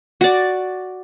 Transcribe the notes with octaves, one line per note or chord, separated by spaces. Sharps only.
F#4 D5